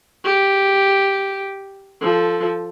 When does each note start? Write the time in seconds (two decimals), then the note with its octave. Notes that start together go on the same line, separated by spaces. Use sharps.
0.25 G4
2.02 F3 A4